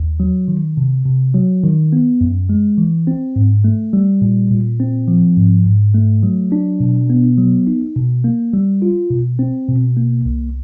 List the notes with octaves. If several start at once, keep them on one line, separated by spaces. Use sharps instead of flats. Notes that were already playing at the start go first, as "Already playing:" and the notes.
Already playing: D#2
F#3
D#3
C3
C3
F#3
D#3
B3
F#2
G#3
E3
C4
G#2
A3
G3
A#2
A#2
C4
F3
G#2
G#2
A3
F#3
D4
B2
B3
F#3
D#4
B2
A#3
G3
F4
B2
C4
B2
A#3
C2